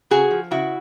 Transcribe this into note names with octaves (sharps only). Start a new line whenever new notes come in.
C#3 F#4 G#4
F3
C#3 E4 F#4